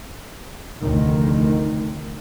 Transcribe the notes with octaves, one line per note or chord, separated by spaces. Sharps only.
F1 D2 D#3